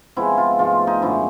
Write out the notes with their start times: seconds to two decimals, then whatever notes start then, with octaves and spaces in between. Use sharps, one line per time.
0.16 C3 F3 G#3 B3 E4
0.38 F4
0.59 G#2 F3 A3 F4
0.87 D#4
1.02 F#2 D3 F3 G#3 E4